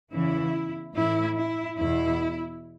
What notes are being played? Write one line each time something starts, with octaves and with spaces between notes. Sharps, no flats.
E2 C#3 E3 E4
A2 E3 E4
E4
E2 B2 E4